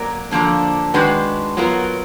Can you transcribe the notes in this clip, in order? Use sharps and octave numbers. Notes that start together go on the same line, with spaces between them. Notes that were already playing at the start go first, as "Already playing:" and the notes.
Already playing: F#3 A#3 A#4 D5
D3 F3 A#3 D4
D#3 G#3 D4 F#4 B4
F#3 B3 F4 A#4